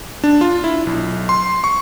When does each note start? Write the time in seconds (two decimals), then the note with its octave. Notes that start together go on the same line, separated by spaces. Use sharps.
0.24 D4
0.41 F4
0.64 E4
0.87 B1
1.29 C6
1.64 C#6